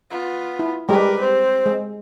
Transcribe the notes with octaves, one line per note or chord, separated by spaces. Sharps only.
B3 F4
E4
G3 G#3 G4 A#4 B4
C4 C5
G#3